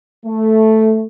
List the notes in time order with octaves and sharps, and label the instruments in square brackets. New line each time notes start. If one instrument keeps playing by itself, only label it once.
[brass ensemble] A3